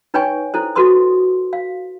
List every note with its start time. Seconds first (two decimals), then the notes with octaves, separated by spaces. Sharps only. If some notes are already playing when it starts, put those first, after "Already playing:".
0.14 D#4 B4 C#5 G5 G#5 C#6
0.54 E4 A4 C5
0.75 F#4 A4 B4 C6 D#6
1.53 F5